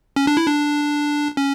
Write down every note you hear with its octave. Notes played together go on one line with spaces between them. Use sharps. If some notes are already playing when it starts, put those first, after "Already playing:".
C#4
D4
E4
D4
C#4